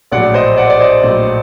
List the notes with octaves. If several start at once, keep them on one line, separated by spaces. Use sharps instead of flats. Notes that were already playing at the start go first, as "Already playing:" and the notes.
A#1 A2 F#3 D5 F#5
C5 D#5
D5 F#5
D5
C5 D#5
A#1 A2 F#3